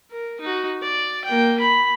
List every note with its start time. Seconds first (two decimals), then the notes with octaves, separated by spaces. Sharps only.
0.11 A#4
0.41 D#4 F#4
0.82 D5
1.25 A#3 G5
1.60 B5